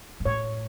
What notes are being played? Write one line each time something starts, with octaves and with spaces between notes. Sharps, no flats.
G#2
A2 C#5